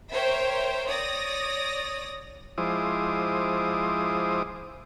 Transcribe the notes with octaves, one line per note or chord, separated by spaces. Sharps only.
A#4 C5 C#5 E5 G5
C#5 D5 D#6 A#6
F3 G#3 E4 C5 D6 D#6